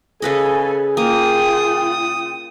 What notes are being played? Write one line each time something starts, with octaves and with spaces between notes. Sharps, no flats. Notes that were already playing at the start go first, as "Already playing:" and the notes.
C#3 G#4 A4 B4 D#5 G#5
A#3 F4 G5 D#6